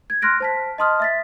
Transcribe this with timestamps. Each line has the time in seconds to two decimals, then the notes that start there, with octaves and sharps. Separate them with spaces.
0.10 G#6
0.22 C6 F6 F#6 A#6 D7
0.40 C5 A5 B6
0.78 D#5 A5 C6 D#6 F6
1.00 E5 A6 B6